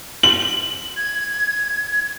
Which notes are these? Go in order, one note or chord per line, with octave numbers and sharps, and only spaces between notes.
F#7
G#6